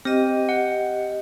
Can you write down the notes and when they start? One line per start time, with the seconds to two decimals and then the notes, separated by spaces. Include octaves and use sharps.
0.05 C4 G4 D#5
0.49 F#5